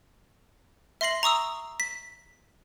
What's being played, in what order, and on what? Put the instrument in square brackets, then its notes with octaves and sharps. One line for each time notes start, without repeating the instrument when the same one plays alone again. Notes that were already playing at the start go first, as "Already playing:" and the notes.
[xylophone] E5 C6 A#6 C7 F#7
A#5 C#6 D#6 E6
B6